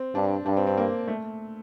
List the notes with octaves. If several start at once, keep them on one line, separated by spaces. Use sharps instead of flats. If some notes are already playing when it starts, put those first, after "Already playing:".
Already playing: C4
G2 D4
G2 D4
C4
C4
A#3
A3